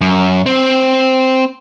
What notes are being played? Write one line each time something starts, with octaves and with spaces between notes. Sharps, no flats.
F#2
C4